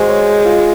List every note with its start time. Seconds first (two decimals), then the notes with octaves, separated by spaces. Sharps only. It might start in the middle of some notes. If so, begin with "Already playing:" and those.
Already playing: G#3 F#4 G#4 C5
0.08 C#5
0.45 F4